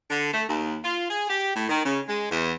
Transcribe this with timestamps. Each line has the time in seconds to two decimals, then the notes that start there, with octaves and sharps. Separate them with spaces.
0.10 D3
0.33 A3
0.48 D#2
0.83 F4
1.09 G#4
1.29 G4
1.55 A2
1.69 D#3
1.85 C#3
2.08 G#3
2.30 E2